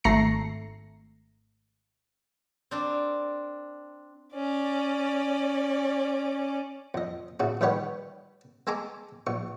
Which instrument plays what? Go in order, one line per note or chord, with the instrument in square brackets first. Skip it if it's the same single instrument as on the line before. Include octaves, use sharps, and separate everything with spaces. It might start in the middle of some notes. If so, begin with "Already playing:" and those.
[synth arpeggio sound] G#1 A3 A#5 A#6 C7 C#7
[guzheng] C4 D4 A#4
[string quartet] C#4 D5
[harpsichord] F2 D#5
A1 C#3 F#4
A2 D#3 G3 B4 C#5 F#5
G#3 A4 G#5 A#5 C6 D6
A#1 C#6